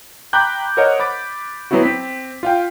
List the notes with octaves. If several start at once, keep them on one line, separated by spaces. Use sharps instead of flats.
G5 A#5 B5 D6 F#6 G6
A#4 C5 C#5 D#5 F#5 A#5
B5 D6 A6
F#3 B3 C4 E4 F#4
C4 B6
F4 F5 G5